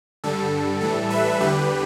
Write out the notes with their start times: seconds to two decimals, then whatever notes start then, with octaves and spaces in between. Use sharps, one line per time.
0.24 G2 D3 G3 A4
0.81 A2 E3 G3 A4
1.10 B4 E5
1.41 E2 D3 G3 G4 B4